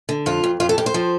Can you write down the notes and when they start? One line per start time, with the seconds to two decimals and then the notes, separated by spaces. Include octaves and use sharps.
0.09 D3
0.26 F2 F4
0.44 F2
0.60 F2 F4
0.69 A4
0.78 F2 G4
0.86 C5
0.94 F3